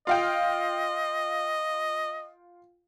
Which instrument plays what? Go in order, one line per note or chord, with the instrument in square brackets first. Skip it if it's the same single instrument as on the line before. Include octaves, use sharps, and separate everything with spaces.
[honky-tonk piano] F4 F5 G5 [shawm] D#5